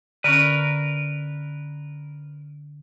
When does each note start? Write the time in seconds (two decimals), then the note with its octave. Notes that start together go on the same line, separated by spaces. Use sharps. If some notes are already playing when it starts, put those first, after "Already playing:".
0.24 D3 C#4 A#4 B4